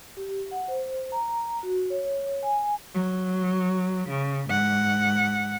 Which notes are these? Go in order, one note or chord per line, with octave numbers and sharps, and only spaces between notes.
G4
F#5
C5
A#5
F#4
C#5
G#5
F#3
C#3
G#2 F#5